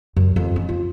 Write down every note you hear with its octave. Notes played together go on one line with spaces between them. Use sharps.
F#2
F2
C#4
F4